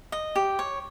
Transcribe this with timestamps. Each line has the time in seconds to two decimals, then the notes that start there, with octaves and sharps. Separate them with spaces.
0.12 D#5
0.36 G4
0.59 C#5